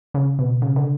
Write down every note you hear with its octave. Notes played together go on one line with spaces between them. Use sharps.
C#3
B2
C#3
D3